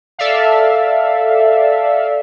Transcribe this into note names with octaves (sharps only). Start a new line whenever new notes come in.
A4 D5 E5 F5